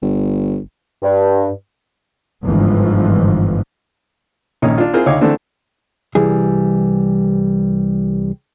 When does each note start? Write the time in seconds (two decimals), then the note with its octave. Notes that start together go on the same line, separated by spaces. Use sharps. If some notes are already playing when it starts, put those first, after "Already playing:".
0.02 G1
1.03 G2
2.44 G1 G#2 E3 F3
4.62 A#1 D#3 A#3 C#4 D#6
4.78 D4 F4
4.93 C4 E4 F4 G#4 A#4 C5
5.06 D2 D#4 C#5 F5 G5 D6
5.21 D3 E3 A3 C4 D4 E4
6.15 C2 E3 G3 G#4